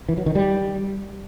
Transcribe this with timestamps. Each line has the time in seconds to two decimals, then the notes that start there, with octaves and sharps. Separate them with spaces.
0.09 E3
0.17 F#3
0.26 D#3
0.35 G3